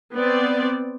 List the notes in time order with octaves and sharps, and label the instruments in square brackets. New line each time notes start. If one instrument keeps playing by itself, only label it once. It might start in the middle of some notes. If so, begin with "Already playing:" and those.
[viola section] B3 C4 D5